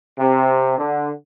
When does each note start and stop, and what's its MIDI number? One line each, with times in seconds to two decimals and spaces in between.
0.19 0.77 48
0.79 1.09 50